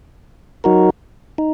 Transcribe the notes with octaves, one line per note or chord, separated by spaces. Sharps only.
F#3 D#4 F#4 A#4
D#4